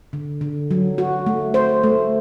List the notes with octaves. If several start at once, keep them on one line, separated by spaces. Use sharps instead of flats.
D3
D3
F#3
F#4
A3
C5
A3